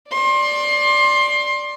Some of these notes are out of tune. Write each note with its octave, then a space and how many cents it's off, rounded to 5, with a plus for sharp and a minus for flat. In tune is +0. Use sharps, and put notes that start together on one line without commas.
D5 +0 C6 +25